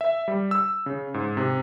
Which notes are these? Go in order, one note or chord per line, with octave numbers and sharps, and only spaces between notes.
E5
G3
E6
C#3
G#2
C3